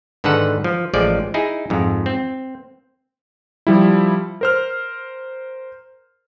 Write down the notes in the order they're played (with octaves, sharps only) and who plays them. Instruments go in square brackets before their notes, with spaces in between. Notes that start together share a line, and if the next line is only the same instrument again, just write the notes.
[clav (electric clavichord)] G#2 D3 D#3 A4 B4 F#5
F3
A1 F3 G#3 D5
D#4 E4 G#4
F2 G#2
C4
[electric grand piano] F3 G3 E4
A#4 C5 F6